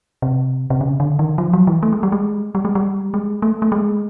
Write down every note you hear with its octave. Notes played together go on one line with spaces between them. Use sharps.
C3
C3
C#3
D3
D#3
F3
F#3
E3
A3
G#3
G3
G#3
G3
G#3
G3
G#3
A3
A3
G#3